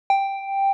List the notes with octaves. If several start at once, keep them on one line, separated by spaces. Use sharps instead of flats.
G5